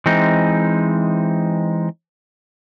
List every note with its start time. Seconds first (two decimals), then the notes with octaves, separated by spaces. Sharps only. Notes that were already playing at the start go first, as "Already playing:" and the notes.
0.06 E3 G#3 C4 D#4